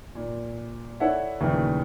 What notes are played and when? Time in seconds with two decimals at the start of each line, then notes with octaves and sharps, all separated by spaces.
0.15 A#2
1.00 E4 A4 C#5 D5 E5 F#5
1.40 D#2 A#2 C#3 E3 F3 A3